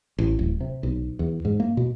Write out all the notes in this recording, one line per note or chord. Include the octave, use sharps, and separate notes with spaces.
A1
D1
C3
B1
E2
G#2
A#3
B2